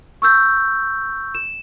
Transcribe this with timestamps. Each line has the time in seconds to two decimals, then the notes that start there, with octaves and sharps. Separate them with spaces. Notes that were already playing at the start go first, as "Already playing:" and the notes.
0.22 C#6 E6 G6
1.35 E7